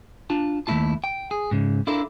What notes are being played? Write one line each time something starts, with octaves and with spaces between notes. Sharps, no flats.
D4 F4 A5
D#2 A3 C4 E4 F4 A5
G5
G#4
G#2 C#3
D4 E4 F4 A4 A#4